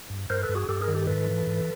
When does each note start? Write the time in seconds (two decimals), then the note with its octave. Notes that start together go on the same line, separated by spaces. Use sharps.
0.10 G2
0.30 G2 A#4 C5
0.43 A4 B4
0.49 G2
0.55 F#4 G#4
0.69 G2 G4 A4
0.81 G#4 A#4
0.88 D#3
0.95 G4 A4
1.07 G#2 A4 B4
1.26 E3
1.47 G#2